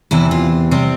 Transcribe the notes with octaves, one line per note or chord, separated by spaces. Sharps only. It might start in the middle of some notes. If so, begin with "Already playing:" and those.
E2 C3 E3 E4
F4
C3 G3 C4